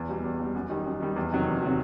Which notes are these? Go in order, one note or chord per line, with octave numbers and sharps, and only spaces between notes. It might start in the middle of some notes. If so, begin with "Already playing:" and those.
Already playing: E2
B2 G3
E2
B2 G3
F#2
D#3 G3
F#2
D#3 G3
E2
C3 D#3 F#3
E2
C3 D#3 F#3